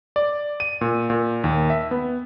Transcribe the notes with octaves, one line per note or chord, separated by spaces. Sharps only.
D5
D#7
A#2
A#2
D#2
E5
B3